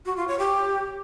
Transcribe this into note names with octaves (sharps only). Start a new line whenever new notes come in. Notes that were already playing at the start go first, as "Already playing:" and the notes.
F#4
F4
C#5
G4